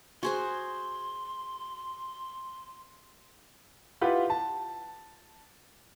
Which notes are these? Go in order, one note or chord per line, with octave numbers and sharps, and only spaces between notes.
F#4 G#4 C5 C6
E4 F4 G4 B4 F#5
A5